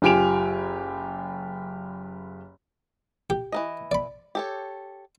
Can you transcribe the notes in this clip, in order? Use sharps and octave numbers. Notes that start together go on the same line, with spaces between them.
F#1 F4 G4 G#5 D7 F7
G4
E3 A#3 D#5
D5 B5
G4 A4 C#5